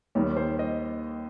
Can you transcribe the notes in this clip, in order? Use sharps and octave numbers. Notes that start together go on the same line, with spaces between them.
D#2 D#3 G3 A#3 C#5
C5
D#5